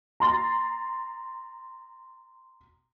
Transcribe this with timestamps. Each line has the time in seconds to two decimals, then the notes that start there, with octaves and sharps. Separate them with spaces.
0.20 A#5 C6 A6